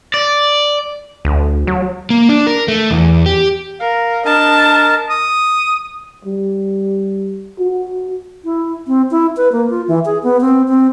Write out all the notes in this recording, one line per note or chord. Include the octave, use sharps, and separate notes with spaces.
D5
D2
F#3
A#3
D4
A#4
A3
E2
G4
A#4 F5
D4 A#4 D#5 A5
D#6
G3
F#4
E4
C4
E4
B4
A#3
F4
E3
G#4
B3
C4
C4